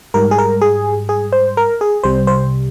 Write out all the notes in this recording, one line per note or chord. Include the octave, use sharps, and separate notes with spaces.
G#2 G3 A#4
G#4
A#4
G#4
G#4
C5
A#4
G#4
C2 C3 G3 C5
C5